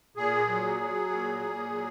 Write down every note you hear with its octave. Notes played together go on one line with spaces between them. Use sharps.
A#2 G#4
F#3
F#3
A#2
A#2
F#3